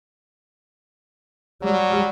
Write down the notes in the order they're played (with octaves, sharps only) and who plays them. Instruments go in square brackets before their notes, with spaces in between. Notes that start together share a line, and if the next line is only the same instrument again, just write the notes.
[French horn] F#3 [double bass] G3